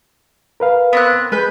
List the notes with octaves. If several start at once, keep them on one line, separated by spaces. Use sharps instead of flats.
A#4 B4 F5
B3 C4 F#6
G#3 B4 G#5 G6